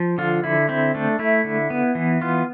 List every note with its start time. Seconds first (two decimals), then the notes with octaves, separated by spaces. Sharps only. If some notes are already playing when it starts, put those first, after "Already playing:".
Already playing: F3
0.18 D3 F4
0.44 D3 E4
0.69 C4 E4
0.95 A3 D4
1.19 A3 E4
1.44 D3
1.70 B3
1.95 E3
2.21 B3 F4